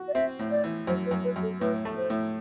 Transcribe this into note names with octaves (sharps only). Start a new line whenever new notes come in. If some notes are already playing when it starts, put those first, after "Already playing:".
Already playing: F#4
D5
C4 E5
A2
D5
E3
F#2 C5
B4
F#2
B4
F#2
A4
A2 B4
A3
C5
A2